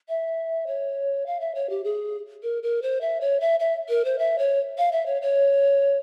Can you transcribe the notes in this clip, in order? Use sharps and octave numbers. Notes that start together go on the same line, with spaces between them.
E5
C#5
F5
E5
C#5
G4
G#4
A#4
A#4
C5
E5
C#5
E5
E5
A#4
C5
E5
C#5
F5
E5
C#5
C#5